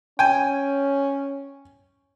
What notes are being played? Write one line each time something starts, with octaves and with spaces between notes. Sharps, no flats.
C#4 G5 G#5